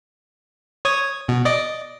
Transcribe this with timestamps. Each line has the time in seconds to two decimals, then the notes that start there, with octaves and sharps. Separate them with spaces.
0.85 C#5 D#6 G#6
1.28 B2
1.45 D5 D#5 D6